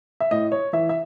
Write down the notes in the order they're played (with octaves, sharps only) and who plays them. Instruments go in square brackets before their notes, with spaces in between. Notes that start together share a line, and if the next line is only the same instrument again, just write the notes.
[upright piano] E5
A2 D#5
C#5
E3 E5
E5